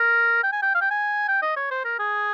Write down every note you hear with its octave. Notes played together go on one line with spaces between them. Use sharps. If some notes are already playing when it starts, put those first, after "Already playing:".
Already playing: A#4
G5
G#5
G5
F5
G5
G#5
G5
D#5
C#5
C5
A#4
G#4